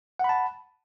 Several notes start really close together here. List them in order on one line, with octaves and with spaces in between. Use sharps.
F#5 B5 A5